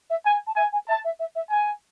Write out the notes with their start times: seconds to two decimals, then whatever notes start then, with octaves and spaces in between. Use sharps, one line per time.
0.10 E5
0.25 G#5
0.47 A5
0.56 E5 G#5
0.73 G#5
0.88 E5 A5
1.04 E5
1.19 E5
1.35 E5
1.51 G#5